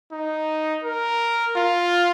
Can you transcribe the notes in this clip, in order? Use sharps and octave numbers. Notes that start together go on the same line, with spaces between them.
D#4
A#4
F4